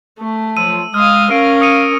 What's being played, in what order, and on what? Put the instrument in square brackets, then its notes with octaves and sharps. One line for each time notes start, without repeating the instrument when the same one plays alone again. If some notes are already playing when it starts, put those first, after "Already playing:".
[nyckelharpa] A3
[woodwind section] F3 F#3 F4 [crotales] E6 D#7
[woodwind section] G#3 [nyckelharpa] F5 D#6 [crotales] F6
[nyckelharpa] C#4 A#4 [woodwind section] F5 [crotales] D7
[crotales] D#6 C#7 D#7